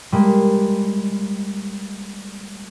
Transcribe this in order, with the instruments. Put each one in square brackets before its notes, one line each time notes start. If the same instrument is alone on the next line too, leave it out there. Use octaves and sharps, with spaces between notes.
[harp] G3 G#3 A#3